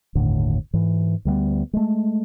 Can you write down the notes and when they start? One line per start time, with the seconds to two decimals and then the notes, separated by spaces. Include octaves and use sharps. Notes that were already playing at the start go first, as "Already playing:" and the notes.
0.15 G1 D#2 A2 D3
0.74 G#2 E3
1.25 D2 G3 G#3 B3
1.73 G#3 A3